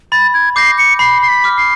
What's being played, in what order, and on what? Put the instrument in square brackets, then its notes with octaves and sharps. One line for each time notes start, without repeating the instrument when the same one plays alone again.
[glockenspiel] B5 [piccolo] A6
[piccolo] G#6
[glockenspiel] D6 G6 A#6 [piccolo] C7
[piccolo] C#7
[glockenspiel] B5 [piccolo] C7
[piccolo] C7
B6
[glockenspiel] D6 F6
[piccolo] C7